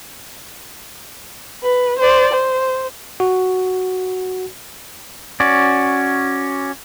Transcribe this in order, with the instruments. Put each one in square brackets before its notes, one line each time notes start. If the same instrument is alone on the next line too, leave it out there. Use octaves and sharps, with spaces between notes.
[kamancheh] B4
C5 D5
C5
[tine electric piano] F#4
[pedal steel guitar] C#4 F#4 D5